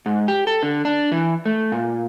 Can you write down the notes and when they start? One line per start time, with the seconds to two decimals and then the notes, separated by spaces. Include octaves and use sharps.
0.06 G#2
0.28 G4
0.47 A4
0.63 D3
0.85 D4
1.12 E3
1.45 A3
1.72 A#2